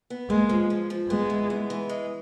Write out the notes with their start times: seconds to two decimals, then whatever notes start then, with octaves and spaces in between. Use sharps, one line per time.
0.10 B3
0.30 G#3 A#3
0.49 F3
0.70 F3
0.90 F3
1.10 G#3 B3
1.30 E3
1.50 B3
1.70 E3
1.89 G#3